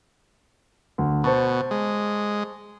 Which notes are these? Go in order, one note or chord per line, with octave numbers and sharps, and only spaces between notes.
D2
B2 C5 A5 C#6
G#3